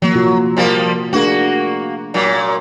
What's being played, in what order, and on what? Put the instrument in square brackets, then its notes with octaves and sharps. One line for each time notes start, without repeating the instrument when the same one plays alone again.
[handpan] F3 A#3 [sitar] F#3
[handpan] C3 F4 F#4
[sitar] F3 G3 A#3
[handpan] A3 D4 G#4 [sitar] A#3 F#4
[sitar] A#2 F#3